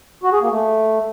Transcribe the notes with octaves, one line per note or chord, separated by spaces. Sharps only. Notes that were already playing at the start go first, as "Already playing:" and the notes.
F#4
G#4
A#3
A3